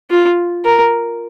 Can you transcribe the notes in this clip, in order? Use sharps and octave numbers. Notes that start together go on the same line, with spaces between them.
F4
A#4